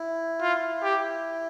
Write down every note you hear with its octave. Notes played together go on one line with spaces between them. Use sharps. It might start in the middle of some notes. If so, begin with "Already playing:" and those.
Already playing: E4
F4
G4